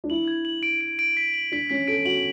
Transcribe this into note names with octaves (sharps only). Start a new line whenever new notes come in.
D4
E4 F#7
G#6
F#7
D7
D7
D7
B6
F#7
D4 B6
C#4 B6
A4 D7
F#4 F#7